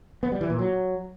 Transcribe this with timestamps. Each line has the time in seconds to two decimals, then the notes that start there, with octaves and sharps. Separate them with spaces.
0.23 B3
0.32 G3
0.41 E3
0.50 A#2
0.59 F#3